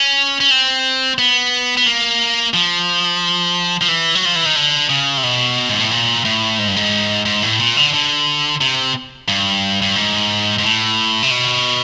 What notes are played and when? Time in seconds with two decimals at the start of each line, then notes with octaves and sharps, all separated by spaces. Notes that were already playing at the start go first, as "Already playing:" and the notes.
Already playing: C#4
0.40 C#4
0.51 C4
1.18 B3
1.77 B3
1.86 A#3
2.54 F3
3.81 F3
3.88 E3
4.15 F#3
4.25 F3
4.36 E3
4.46 D#3
4.56 D3
4.90 C#3
5.17 C3
5.23 B2
5.69 G#2
5.80 A2
5.91 A#2
6.25 A2
6.58 G#2
6.68 G2
6.76 G#2
7.25 G#2
7.43 A2
7.60 A#2
7.77 D3
7.93 D3
8.61 C3
9.28 G2
9.82 G2
9.96 G#2
10.58 G#2
10.64 A2
11.22 C3
11.31 B2